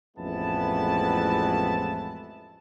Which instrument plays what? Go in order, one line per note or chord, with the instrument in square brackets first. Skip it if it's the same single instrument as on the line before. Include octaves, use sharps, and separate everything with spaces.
[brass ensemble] A1 F2 G#3 B3 E4 A5